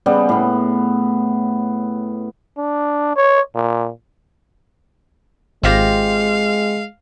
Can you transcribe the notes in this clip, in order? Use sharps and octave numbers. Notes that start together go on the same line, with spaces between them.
C#3 G3 B3
A2 B3
D4
C#5
A#2
G#1 G#3 C4 F4 G4 F5 A#6